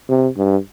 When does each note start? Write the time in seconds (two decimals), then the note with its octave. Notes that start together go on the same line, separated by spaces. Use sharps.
0.09 C3
0.37 G2